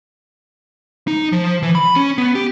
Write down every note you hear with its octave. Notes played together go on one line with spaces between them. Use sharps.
D#4
F3
E3
B5
C#4
B3
G4